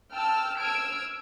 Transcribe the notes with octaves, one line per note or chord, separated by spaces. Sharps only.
G5 A5 E6 F6
E6 F6 G#6 D7